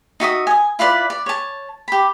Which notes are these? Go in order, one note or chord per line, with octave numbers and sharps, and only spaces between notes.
D#4 F#4 E5 D#6
G#5 D#6
E4 F4 B4 D5
D5
C#5 A5
G4 B5